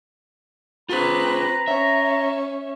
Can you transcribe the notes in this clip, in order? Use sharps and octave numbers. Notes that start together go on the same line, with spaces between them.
C4 F4 G#4 B4 A#5
C#4 E5